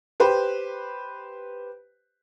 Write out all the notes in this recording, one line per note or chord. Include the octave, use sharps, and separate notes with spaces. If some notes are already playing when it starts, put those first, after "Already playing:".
G4 B4 C5